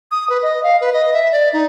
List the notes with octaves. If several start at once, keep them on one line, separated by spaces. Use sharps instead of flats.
D#6
B4
D#5
F5
B4
D#5
E5
D5
D#4